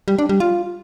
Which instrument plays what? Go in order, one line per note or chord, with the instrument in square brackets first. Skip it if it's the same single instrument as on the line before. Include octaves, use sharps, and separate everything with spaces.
[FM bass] G3
D4
G3
F4